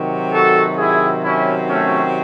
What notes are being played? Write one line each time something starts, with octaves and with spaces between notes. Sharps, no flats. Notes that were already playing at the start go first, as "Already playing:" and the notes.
Already playing: C3 D#3 F#3
F#4 A4
E4 G#4
C#4 E4
A3 C#4